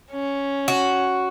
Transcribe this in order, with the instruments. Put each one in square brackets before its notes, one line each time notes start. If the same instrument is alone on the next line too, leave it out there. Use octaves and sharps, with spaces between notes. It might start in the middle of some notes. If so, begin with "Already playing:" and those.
[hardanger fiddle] C#4
[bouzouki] F#4